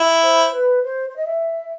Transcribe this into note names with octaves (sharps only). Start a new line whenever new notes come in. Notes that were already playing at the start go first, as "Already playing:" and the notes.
Already playing: E4
C5
B4
C5
C5
D#5
E5